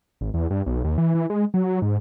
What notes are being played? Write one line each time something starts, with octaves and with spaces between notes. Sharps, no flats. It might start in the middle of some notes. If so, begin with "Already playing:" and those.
G#1
E2
G2
B1
D#2
E3
E3
G#3
F#3
G#2